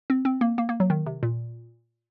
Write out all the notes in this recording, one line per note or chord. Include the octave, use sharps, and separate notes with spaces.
C4
C4
A#3
A#3
A#3
F#3
D#3
C3
A#2